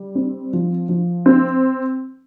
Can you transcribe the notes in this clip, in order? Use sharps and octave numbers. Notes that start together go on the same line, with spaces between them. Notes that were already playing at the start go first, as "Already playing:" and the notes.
Already playing: G3
C4
F3
F3
C4